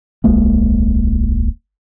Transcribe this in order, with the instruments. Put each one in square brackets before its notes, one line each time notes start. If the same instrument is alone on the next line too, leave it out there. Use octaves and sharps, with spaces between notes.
[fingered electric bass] D1 B1 G#3 A#3